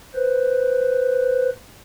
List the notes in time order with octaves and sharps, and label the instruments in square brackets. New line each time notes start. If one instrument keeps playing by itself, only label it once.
[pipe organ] B4 C5